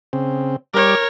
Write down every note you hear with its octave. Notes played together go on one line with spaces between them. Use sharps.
C#3 C4
G3 A#4 C#5 D6